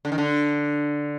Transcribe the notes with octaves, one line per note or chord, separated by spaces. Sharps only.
D3
D#3
D3